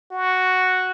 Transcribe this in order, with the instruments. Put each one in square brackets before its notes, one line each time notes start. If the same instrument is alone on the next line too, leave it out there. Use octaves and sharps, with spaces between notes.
[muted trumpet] F#4